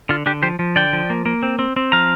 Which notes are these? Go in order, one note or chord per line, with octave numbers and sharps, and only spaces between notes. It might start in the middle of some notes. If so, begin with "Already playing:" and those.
D3 F4
D3 D4 G4
F3 G4 C5
F3
D3 D5 G5
F3
A#3
A#3
C4
C4
C4
F3 F5 A#5